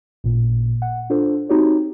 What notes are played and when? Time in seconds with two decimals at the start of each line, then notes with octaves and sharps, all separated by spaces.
0.24 A1 A#2
0.82 F#5
1.10 D4 F4 A4 C5
1.49 C4 D#4 F#4 G4 C#5